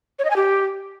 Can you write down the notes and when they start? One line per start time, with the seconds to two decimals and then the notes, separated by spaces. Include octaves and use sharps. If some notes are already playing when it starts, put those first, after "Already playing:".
0.19 C#5
0.25 D#5
0.30 G#5
0.36 G4